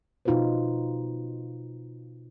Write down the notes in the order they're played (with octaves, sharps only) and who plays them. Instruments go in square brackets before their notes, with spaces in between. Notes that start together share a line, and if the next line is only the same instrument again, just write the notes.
[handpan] B2 D#4 F4 F#4 B4 C5